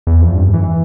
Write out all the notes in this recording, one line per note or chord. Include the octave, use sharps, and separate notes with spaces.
E2
F2
G2
E3
E3